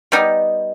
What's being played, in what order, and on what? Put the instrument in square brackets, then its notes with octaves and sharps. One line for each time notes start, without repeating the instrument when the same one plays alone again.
[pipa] G3 B3 D#4